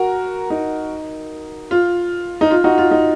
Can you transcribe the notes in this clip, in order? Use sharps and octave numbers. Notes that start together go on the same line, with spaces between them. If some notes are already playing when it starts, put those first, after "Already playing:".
Already playing: F#4 A#4
D#4
F4
D#4
F4
D#4 F#4
F4
D#4